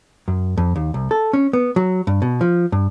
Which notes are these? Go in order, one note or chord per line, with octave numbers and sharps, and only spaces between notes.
F#2
F2
D#2
C2
A4
C#4
B3
F#3
G2
B2
F3
G2